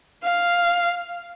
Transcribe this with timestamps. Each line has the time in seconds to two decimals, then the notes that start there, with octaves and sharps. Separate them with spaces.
0.24 F5